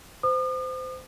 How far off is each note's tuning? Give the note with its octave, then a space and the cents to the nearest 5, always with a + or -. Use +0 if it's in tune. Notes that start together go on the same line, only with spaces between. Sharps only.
C5 -25 D#6 -45